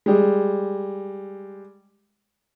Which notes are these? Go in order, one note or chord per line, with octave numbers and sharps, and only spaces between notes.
G3 G#3